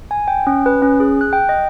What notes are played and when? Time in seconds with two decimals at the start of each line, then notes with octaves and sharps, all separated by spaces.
0.11 G#5
0.28 G5
0.47 C#4
0.66 B4
0.82 C#4
1.00 G#4
1.21 F#6
1.33 G5
1.49 D#5